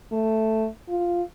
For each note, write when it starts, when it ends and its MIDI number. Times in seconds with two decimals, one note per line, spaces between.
0.12 0.67 57
0.89 1.23 65